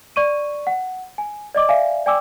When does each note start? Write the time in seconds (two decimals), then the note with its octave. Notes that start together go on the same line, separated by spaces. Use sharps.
0.16 D5 C#6 D#7
0.67 F#5
1.18 G#5
1.55 D5 D#5 D6
1.69 D5 E5 F5 G#5
2.06 D5 G5 G#5 D6 E6